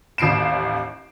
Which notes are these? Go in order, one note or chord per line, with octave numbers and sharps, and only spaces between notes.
A1 D#2 C7 D7 E7